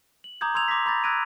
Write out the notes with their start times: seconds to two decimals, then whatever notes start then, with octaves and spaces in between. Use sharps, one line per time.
0.24 F#7
0.41 A#5 D6 D#6 G6 G#6
0.55 C6 E6 G#6 F7
0.68 C6 D6 A#6 B6
0.85 A#5 B5 D6 G6 A6 A#6
1.04 E6 F#6 G#6 A#6 D7 D#7